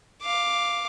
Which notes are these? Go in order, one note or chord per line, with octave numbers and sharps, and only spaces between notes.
F5 D6